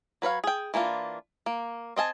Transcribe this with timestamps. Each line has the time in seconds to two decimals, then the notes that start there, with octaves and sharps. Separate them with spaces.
0.22 F#3 B4 C#5 F5
0.44 G#4 G5
0.74 E3 A#3 D4 F4
1.46 A#3
1.96 C4 D#5 G#5 A5